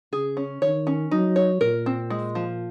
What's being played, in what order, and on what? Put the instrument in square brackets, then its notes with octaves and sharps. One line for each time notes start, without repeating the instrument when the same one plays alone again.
[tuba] C#3 [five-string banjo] G#4
[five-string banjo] C#4
[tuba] D#3 [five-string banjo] C#5
[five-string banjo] C#4
[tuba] F#3 [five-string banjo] D#4
[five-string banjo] C#5
[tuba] A#2 [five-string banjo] A#4
[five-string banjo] C4
G#3
F3